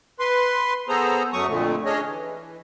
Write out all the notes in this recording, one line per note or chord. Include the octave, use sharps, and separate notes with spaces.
B4 C6
B3 G#4 A4 C5 A#5
F#2 F#3 A3 C#6 D#6
F2 A#2 D3 A3
C#4 D4 G#4 C#5 D#5
E3